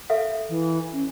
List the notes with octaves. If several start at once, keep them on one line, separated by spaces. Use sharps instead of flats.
A4 E5 F5
E3
C#4